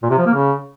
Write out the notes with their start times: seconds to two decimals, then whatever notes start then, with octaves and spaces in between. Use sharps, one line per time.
0.02 A#2
0.10 C3
0.18 F3
0.26 A#3
0.34 C#3